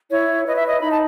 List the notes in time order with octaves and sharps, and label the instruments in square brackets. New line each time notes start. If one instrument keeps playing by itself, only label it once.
[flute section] E4 C#5
B4 D#5
E5
D#5
D#4 B5
A5